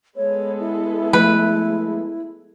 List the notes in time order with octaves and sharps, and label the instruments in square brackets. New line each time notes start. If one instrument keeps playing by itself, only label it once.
[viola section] G#3 B3 A4 [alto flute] C#5
[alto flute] E4
[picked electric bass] F3 A3 [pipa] B4